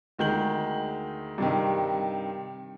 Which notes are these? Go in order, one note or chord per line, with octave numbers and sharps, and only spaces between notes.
D2 D#3 G#3 G6 F#7
G2 C3 D#3